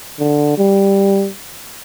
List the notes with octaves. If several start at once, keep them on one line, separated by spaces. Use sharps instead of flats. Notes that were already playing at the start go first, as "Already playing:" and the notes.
D3
G3